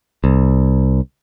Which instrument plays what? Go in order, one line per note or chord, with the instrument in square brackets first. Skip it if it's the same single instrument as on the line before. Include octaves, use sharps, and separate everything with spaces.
[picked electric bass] C2